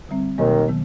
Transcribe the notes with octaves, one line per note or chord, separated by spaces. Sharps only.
D3 G3 C4
D#2 B2 D#3 F#3 A#3
D#3 F#3 B3